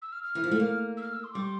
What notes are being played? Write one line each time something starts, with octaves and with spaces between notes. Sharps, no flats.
E6
F6
F6
E3
F3
A3
A#3
E6
F6
E6
C6
G3 D6
C6